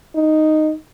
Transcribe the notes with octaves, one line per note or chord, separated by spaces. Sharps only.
D#4